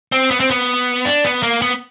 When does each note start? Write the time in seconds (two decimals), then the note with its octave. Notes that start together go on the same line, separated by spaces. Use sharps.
0.12 C4
0.31 B3
0.40 C4
0.51 B3
1.05 D4
1.24 B3
1.43 A#3
1.62 B3